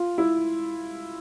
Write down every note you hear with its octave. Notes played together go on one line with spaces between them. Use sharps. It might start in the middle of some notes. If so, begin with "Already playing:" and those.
Already playing: F4
E4